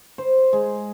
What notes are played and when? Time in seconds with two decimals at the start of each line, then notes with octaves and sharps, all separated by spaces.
0.18 C5
0.53 G#3